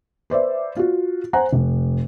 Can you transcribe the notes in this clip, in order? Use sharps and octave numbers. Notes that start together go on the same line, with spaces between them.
B4 C5 D5 E5
F4 F#4
C5 F#5 G#5 A#5
F1